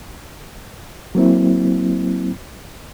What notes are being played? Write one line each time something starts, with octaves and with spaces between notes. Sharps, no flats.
F#3 A#3 C4 E4